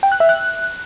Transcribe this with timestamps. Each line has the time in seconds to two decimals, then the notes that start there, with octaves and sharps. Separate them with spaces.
0.03 G5
0.12 F#6
0.20 E5
0.29 F#6